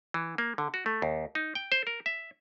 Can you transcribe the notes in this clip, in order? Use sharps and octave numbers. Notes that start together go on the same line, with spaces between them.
E3
A#3
D3
F#4
A3
D#2
D#4
G5
C5
A#4
E5